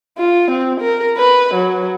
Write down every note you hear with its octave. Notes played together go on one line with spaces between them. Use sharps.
F4
C4
A#4
B4
F#3